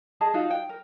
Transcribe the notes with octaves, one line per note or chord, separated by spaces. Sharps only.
G#4 D#5 A5
D#4 F4 F#4
G5
A#4